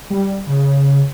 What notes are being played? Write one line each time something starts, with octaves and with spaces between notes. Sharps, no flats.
G3
C#3